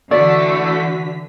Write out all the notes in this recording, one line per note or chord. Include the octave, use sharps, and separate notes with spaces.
D3 E3 A3 F#4 D5 B6